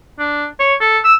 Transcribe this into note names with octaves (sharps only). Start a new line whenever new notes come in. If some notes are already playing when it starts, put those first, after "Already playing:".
D4
C#5
A4
E6